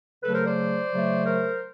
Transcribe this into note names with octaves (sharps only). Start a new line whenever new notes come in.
C#3 F#3 A3 A4 B4
A#4 C5
C5 D5
C#3 F#3 A3
A#4 C5